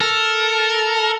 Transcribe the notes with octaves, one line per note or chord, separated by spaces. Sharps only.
A4 A#4